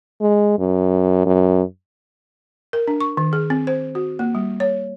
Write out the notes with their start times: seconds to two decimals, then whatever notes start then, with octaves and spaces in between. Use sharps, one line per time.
0.21 G#3
0.59 F#2
1.26 F#2
2.73 A#4
2.88 D4
3.01 C#6
3.17 D#3
3.33 G#4
3.50 C4
3.67 C5
3.95 F#4
4.19 A#3
4.35 G3
4.60 C#5